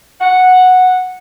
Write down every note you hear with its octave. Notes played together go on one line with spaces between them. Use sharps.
F#5